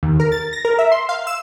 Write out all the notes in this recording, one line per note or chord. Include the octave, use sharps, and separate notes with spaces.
D#2
A#4
A6
A#6
A#4
E5
C6
F5
E6